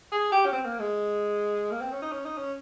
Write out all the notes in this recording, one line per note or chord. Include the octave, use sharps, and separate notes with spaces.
G#4
G4
C#4
C4
A#3
G#3
A#3
C4
C#4
D#4
C#4
D#4
C#4